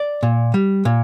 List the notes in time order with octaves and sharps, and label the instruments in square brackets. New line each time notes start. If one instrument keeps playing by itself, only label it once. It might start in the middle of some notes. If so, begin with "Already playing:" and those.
Already playing: [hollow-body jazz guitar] D5
A#2
G3
A#2